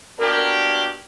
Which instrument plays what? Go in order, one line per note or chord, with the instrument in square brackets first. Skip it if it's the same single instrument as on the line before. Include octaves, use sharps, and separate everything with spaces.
[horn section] B2 A#3 D4 G4 [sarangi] A#4